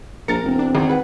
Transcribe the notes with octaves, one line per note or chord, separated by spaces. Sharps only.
A#1 A#4 A#5 A6 C#7
E1 C4
D4
G#1 D#3
G#4 B4 F#5